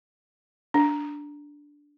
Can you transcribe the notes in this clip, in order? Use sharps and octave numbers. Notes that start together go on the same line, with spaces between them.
D4